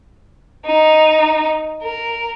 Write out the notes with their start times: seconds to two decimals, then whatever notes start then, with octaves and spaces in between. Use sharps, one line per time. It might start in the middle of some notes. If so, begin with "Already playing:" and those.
0.67 D#4
1.84 A#4